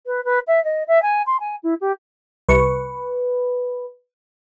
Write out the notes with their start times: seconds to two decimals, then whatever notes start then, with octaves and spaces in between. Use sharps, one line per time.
0.06 B4
0.25 B4
0.47 E5
0.64 D#5
0.88 E5
1.02 G#5
1.27 C6
1.40 G#5
1.63 E4
1.81 G4
2.49 C2 B4 C#6